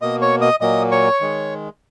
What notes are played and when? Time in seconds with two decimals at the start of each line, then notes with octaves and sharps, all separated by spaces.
0.01 B2 A#3 D#5 D#6
0.21 C#5 C#6
0.41 D#5 D#6
0.61 A#2 F#3 A#3 D#5 D#6
0.91 C#5 C#6
1.21 D#3 G#3